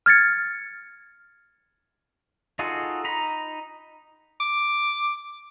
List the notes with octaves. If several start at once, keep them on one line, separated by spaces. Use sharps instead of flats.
F6 G#6 A6 C#7
D#4 F4 F#4 G#4 A4
D#4 A#5 B5
D6